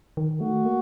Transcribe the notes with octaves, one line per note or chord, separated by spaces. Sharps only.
D#3
A3 F#4
A#3